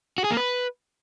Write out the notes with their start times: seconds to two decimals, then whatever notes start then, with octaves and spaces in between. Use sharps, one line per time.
0.18 F#4
0.24 G#4
0.31 A#3
0.37 B4